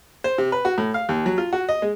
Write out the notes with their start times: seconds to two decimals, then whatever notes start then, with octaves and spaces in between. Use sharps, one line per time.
0.24 C5
0.38 C3
0.52 B4
0.65 F#4
0.78 A2
0.94 F5
1.09 D#2
1.26 F#3
1.38 F4
1.53 F#4
1.69 D#5
1.82 G#3